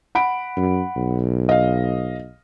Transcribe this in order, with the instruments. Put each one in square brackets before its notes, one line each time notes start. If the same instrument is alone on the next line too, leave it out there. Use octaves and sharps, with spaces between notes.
[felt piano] F#5 B5 D7
[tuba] F#2
B1
[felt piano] D#5 F5